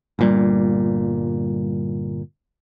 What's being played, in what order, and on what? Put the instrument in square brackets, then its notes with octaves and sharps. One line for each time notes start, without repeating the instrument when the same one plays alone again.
[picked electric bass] G1 A#2 G3